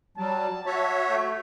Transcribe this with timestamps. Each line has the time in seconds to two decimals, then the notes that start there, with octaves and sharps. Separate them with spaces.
0.17 F#3 G3 A5
0.66 F#4 C#5 E5
1.09 A3